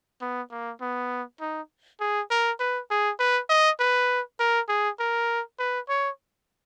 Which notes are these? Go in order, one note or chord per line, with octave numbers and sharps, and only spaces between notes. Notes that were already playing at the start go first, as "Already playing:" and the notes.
B3
A#3
B3
D#4
G#4
A#4
B4
G#4
B4
D#5
B4
A#4
G#4
A#4
B4
C#5